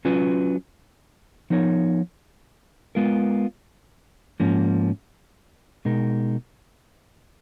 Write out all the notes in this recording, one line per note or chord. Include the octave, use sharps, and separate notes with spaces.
F#3 C#4 F4 B4
F3 B3 D#4 A#4 C#5
G#3 B3 F4 A#4
G#2 F3 A#3 C#4
B2 G#3 D#4 A#4